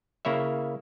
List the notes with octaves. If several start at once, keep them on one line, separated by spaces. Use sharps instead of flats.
C#3 A#3 E4 C#5 E5